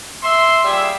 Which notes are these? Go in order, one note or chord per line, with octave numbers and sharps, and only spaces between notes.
E5 C6
A#2 G3 G#4 E5